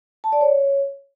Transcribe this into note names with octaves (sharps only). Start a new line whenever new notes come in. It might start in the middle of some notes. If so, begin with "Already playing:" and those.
A5
D5
C#5